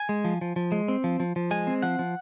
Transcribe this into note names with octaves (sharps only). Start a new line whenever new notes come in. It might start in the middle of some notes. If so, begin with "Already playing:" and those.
Already playing: G#5
G#3
F3
F3
F3
G#3
C4
F3
F3
F3
G#3 G#5
C4
F3 F#5
F3